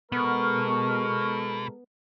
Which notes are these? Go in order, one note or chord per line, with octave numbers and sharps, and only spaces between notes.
B2 G#3 B3 A4 A#4 C#6 F6